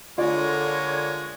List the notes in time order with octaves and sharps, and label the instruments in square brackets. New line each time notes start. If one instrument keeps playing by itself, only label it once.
[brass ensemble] D3 [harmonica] G#3 A#3 [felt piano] F4 D5 [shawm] C#5